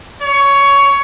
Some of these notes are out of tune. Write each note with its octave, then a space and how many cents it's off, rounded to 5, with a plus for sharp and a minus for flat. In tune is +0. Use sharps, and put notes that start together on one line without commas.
C#5 +15